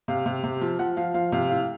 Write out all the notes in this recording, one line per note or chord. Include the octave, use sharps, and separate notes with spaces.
C3 F5
C3
C3
F3
F3 F#5
F3 F5
F3 F5
C3 F5
A2 F5